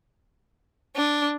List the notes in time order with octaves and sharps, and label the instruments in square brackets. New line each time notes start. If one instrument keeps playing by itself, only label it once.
[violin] D4